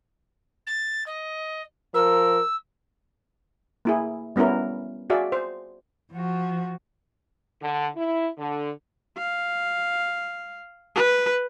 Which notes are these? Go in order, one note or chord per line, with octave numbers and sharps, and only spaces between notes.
A6
D#5
F3 A#4 E6
A#3 E4 G#4
G3 B3 C#4 E4 A#4
F#4 G#4 D5 E5 F5
C5
F3 F#4
D3
E4
D3
F5
B4